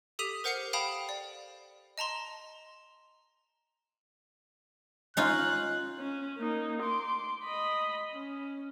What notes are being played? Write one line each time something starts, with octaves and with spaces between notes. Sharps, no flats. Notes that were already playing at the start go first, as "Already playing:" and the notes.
G4 A4 D#6 B6 D#7 F7
A#4 C5 F#5 F6 C7 C#7
F5 G5 A5 B5 D#6 F7
D5
D#5 A5 A#5 C6
C#4 D#4 F4 F#6
C#4
A#3 D#4
C6 D6
D#5 B5
C#4